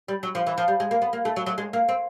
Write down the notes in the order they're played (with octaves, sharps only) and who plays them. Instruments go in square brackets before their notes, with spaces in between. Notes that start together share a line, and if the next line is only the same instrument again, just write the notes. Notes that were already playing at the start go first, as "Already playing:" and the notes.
[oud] G3
F#3
F3
E3
F3
G3
G#3
A#3
B3
A#3
A3
F#3
F#3
G#3
A#3
C4